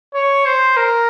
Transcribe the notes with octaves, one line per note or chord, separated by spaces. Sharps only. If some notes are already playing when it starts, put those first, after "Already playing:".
C#5
C5
A#4